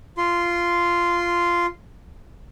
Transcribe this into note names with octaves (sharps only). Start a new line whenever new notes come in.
F4 C6